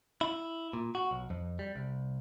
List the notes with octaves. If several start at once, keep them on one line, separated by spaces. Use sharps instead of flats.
E4
A#2
F#4
B1
F2
G3
C2